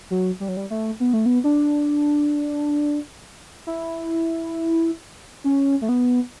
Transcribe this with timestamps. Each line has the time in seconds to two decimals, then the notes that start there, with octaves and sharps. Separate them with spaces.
0.10 F#3
0.40 G3
0.48 F#3
0.57 G3
0.70 A3
1.00 B3
1.13 A3
1.26 B3
1.44 D4
3.67 E4
5.44 C#4
5.82 A3
5.89 B3